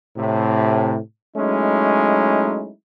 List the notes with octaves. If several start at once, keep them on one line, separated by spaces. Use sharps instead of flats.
A2 C3
F#3 G#3 A3 C#4 D#4 E4